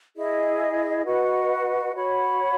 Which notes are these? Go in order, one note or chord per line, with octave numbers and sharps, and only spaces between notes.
E4 G#4 D#5
F#4 B4 D#5 F#5
F#4 C#5 F#5 B5